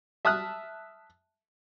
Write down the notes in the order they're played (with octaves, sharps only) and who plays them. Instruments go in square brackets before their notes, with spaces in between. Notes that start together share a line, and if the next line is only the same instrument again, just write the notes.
[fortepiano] E5 A5 D#6 F6 F#6